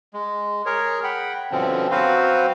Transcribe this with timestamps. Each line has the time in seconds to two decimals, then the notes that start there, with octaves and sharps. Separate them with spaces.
0.14 G#3
0.66 G#4 A#4 C#5
1.04 F#5 G5 B5
1.51 G2 B2 D3 F3 C4 C#4
1.91 F#3 C4 F#4 B4 C5 F5